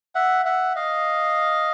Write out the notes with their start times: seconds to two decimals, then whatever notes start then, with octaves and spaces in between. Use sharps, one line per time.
0.15 E5 F#5
0.45 E5 F#5
0.76 D#5 F5